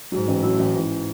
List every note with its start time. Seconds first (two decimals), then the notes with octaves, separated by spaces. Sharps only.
0.12 G#2 F#3
0.28 A1
0.43 A2 F#3
0.59 A1
0.75 G#2 E3